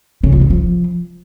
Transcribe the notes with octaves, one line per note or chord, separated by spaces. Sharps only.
C#3
F3
G2
F3